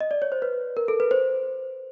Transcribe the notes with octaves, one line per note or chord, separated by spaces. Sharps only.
D#5
D5
C#5
C5
B4
A#4
A4
B4
C5